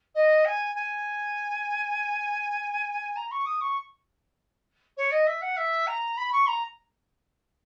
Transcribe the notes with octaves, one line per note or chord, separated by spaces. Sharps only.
D#5
G#5
G#5
A#5
C#6
D#6
C#6
C#5
D#5
E5
F#5
E5
A#5
B5
C#6
A#5